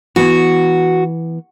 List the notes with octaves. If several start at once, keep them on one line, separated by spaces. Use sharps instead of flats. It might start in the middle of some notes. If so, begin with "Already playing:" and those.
E3 B3 F#4